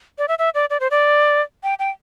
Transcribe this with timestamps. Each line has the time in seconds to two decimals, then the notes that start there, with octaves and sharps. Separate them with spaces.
0.18 D5
0.28 E5
0.39 E5
0.55 D5
0.70 D5
0.80 C5
0.91 D5
1.63 G5
1.79 G5